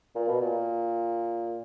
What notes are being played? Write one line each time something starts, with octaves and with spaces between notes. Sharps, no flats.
A#2
B2
A#2